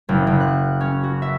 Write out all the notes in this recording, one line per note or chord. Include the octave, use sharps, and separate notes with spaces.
F#1
F#1
F#6
C#4
F#4
E5